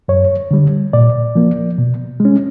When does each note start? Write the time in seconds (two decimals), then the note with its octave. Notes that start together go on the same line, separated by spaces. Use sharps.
0.08 F#2 C#5
0.51 D3 G3
0.93 A#2 D5
1.35 F3 A#3
1.78 B2
2.20 G#3
2.25 C#4